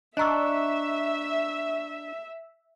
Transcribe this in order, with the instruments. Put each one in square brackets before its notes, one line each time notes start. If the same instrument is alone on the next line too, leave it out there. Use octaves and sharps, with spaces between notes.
[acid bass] D4 [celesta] D#5 A#5 E6 [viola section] E5 [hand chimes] C#6 F#6